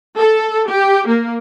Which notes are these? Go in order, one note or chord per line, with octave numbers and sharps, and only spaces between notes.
A4
G4
A#3